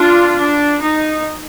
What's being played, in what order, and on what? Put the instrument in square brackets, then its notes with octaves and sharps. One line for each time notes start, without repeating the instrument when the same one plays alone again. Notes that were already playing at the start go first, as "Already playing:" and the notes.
Already playing: [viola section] D4 F4
D4
D#4